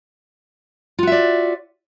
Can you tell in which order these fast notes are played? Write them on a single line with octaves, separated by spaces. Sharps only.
F4 F#4 E5 D5